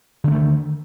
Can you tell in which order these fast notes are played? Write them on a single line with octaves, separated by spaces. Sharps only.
D3 B3 A3 D#3